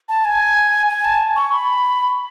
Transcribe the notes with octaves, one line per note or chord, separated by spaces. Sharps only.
A5
G#5
G#5
A5
C#6
B5